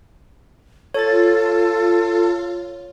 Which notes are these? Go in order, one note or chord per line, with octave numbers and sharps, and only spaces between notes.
F4 A4 C#5 A6